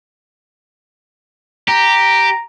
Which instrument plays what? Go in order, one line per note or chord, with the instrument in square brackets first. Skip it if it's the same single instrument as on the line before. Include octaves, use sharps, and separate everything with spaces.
[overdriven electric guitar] G4 [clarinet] A#5